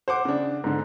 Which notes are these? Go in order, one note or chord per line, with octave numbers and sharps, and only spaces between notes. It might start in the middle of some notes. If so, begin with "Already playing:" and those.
C5 F#5 D6
C#3 D4
G#2 D3